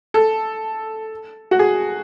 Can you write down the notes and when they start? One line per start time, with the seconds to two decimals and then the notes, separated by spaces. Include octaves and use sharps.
0.14 A4
1.51 F#4
1.59 G#4